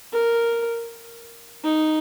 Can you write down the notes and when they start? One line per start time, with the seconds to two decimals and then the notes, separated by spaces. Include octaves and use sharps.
0.13 A#4
1.64 D#4